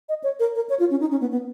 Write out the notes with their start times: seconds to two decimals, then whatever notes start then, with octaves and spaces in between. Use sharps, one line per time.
0.09 D#5
0.24 C#5
0.40 A#4
0.55 A#4
0.69 C#5
0.80 F4
0.91 C#4
1.01 D#4
1.11 C#4
1.21 B3
1.31 B3